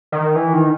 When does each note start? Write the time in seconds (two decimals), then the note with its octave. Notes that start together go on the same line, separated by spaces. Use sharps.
0.12 D#3
0.36 E3
0.53 D#3